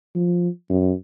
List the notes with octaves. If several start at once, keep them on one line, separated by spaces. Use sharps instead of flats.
F3
F#2